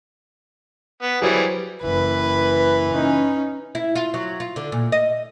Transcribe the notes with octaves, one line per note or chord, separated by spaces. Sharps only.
B3
E3 F#3 G3 G#4 B4 C5
F#1 E3 B4
C#4 D#4
E4
F4
F#3
F4
D3
A#2
D#5